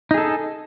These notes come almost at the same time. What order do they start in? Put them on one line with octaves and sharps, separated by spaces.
D#4 G#4 A4